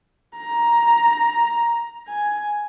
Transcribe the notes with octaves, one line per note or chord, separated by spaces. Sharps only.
A#5
G#5